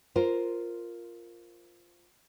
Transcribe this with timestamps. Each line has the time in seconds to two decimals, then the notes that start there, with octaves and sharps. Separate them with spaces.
0.16 F4 A#4 C5